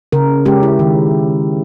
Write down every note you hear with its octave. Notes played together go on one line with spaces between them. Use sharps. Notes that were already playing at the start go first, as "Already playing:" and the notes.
C#3 A#4
G#3 C#4 G4
E4
D#3